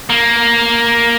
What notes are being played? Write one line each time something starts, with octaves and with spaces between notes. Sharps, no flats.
A#3